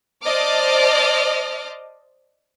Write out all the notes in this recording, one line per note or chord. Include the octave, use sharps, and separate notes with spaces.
C5 D5 D#5 A5 D6 F6